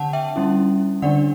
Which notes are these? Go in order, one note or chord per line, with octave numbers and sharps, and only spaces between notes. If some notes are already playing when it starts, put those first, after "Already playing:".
Already playing: D3 D4 F#5 A5
E5 G5
G3 C#4 E4
D3 G3 D4 D5 F#5